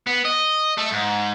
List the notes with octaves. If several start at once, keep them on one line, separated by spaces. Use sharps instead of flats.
B3
D#5
A3
G#2